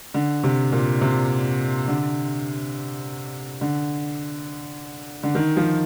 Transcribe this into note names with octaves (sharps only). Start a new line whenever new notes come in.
D3
C3
A#2
C3
D3
D3
D3
D#3
F3